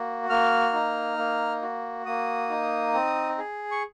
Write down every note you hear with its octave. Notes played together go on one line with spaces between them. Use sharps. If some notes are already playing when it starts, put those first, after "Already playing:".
Already playing: A#3 F#4
A#3 F6
D#4
A#3
F#4
A#3 D#6
D#4
C4
G#4
C#6